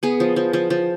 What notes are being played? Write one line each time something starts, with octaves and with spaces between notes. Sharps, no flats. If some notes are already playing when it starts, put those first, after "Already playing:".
B3 G#4
F3
F3
F3
F3